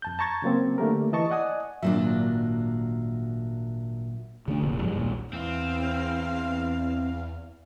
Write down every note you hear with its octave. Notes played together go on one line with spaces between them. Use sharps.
F2 A5 G6
A5 A#5 C#6 G#6 A6
C#3 F#3 A#3 C4
D3 A3 A#3 G4 A#4
E3 D#5 A5 C#6
D5 D#5 F#5 G#5 D#6
G#1 A#2 F#3 A#3 D4 E5
D3 A3 D4
F1 A#2
G#2 F3 F#3 G#3
A#1 D#2 A#2
E2 E3 C4 F5